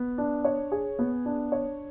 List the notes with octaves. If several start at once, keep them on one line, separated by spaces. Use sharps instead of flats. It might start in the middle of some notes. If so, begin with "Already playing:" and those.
Already playing: B3
D4
C#5
G#4
B3
D4
C#5